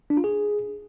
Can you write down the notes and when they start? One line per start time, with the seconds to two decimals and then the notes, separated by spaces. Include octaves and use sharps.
0.10 D4
0.17 F4
0.24 G#4